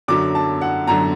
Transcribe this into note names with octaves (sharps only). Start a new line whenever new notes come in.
F#2 D3 F#3 D6
A5
F#5
F#2 D3 F#3 A#5